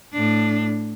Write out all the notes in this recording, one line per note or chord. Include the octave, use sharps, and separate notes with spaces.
A2 D4